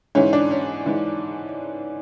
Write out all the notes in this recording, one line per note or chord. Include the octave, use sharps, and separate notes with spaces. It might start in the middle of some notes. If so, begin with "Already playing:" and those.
G#2 E3 C#4
D4
C#4
G#2 E3